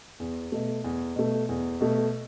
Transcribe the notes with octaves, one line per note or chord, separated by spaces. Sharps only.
E2
B2 A3
E2
B2 A3
E2
B2 A3